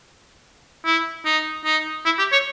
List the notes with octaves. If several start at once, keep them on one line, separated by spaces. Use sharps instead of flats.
E4
D#4
D#4
E4
G4
C#5